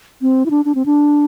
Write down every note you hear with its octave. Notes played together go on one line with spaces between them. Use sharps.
C4
E4
D4
D4
C4
D4